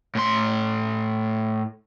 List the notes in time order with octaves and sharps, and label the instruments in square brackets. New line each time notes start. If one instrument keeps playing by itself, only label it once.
[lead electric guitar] A2 C6